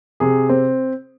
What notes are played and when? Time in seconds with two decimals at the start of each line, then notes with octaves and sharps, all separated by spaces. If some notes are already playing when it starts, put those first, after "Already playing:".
0.20 C3 G#4
0.49 C4